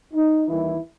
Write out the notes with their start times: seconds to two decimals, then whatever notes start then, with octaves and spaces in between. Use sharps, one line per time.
0.14 D#4
0.48 D#2 D#3 E3 G3 E4